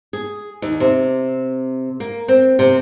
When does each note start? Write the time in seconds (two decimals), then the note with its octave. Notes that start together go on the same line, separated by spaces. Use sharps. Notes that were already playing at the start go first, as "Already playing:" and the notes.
0.13 G#4
0.62 D#2
0.80 C3
2.00 A#3
2.28 C4
2.59 C3